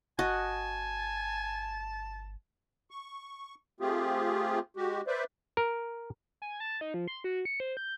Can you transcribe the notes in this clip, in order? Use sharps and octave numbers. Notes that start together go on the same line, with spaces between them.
G1 F#4 D#5 G#5 A5
C#6
A3 C4 F4 G4 G#4
G#3 F#4 G4
B4 C5 D5 E5
A#4
G#5
A5
D#4
F3
C6
F#4
C#7
C5
G6